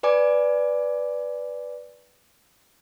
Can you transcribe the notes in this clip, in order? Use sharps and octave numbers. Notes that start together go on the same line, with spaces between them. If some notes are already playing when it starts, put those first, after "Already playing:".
B4 D5 G#5 D6